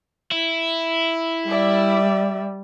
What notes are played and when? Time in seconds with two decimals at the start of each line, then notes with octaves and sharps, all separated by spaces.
0.32 E4
1.48 G3 D5 E5